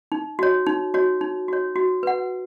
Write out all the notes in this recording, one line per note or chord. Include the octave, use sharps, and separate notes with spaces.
D#4
F#4 C#5
D#4
F#4 C#5
D#4
F#4 C#5
F#4
B4 F#5